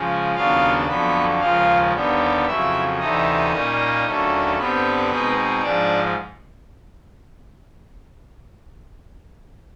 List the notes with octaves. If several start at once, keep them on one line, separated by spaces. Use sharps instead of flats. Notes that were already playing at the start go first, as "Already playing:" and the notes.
Already playing: C#3 F3 G#3
D#2 C#3 F#3 B3 D4 F4 F5
F2 D3 F#3 B3 B4
D#2 C#3 F3 G#3 F4 F5
D#2 D3 G3 B3
F2 C#3 F#3 E4 E5
D2 C3 E3 A3 D#4 D#5
A#2 G3 A#3 C#4
D#2 D3 F#3 A3 C#4
G2 D3 G3 B3 C4 B4
B2 G#3 C4 D#4
G#2 F3 G#3 D4 D5